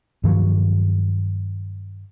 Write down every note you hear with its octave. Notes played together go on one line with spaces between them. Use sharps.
G2 D#3 F3 F#3